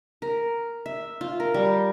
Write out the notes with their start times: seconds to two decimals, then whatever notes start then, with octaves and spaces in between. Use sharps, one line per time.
0.22 A#4
0.86 E5
1.21 F4
1.40 A#4
1.54 G3